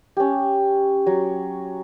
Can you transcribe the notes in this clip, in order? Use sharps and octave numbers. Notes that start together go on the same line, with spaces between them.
C#4 G4
F#3